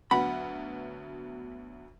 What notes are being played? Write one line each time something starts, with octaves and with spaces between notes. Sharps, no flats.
D2 F#3 B3 F#5 B5